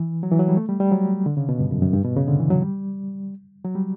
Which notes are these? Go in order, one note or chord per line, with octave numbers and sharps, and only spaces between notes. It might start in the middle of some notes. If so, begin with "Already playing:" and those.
Already playing: E3
F#3
E3
F#3
G3
A3
G3
G3
F#3
D3
C#3
B2
G2
F#2
F#2
G2
B2
C#3
D3
E3
F#3
G3
F#3
G3